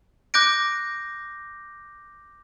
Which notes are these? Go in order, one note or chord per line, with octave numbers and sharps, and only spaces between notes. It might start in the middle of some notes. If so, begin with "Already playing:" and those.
D6 F#6 G6 A#6 D7